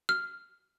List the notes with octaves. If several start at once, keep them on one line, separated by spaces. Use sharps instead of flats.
F6